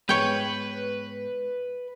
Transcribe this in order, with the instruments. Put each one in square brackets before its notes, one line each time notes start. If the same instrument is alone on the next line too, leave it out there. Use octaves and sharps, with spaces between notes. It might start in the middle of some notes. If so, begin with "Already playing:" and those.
[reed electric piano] G#2 G#3 B3 [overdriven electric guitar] B4 [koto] C#5 G5